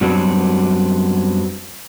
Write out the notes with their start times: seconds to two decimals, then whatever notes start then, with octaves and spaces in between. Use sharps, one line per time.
0.01 F#2 F#3 G3 B3 C4 D4